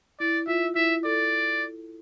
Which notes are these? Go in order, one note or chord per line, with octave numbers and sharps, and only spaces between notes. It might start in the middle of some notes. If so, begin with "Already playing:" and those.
E4 D5
F4 E5
E4 E5
A4 D5